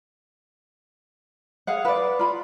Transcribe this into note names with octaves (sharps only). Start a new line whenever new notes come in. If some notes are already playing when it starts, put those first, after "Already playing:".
G#4 F5 F#5
B4 D5
F4 B5